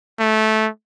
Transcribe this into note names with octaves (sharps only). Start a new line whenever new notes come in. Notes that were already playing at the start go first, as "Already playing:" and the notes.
A3